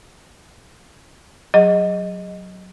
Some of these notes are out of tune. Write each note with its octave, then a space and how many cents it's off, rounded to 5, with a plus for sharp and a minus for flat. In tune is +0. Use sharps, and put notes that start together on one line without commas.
F#3 +0 G#4 -20 D#5 +0